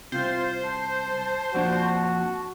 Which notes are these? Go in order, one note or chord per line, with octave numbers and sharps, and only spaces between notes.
C2 C3 F4 C5
A5
F2 A#2 D4 F#4